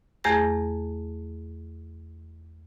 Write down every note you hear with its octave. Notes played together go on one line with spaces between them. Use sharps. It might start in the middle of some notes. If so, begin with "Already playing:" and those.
E2 A3 G#4 A#5 A#6